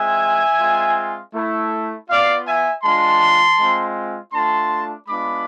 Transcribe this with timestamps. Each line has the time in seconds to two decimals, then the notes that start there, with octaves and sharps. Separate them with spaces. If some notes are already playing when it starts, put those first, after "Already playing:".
Already playing: G#3 C4 F4 E5 G#5
0.59 G#3 C4 F4
1.34 A3 E4
2.09 B3 F4 D5 F5
2.47 E5 G#5
2.84 G#3 D4 F4 A5 C6
3.59 G#3 C4 F4
4.33 A3 D4 F4 A5 C6
5.08 G#3 B3 D4 F4 B5 D6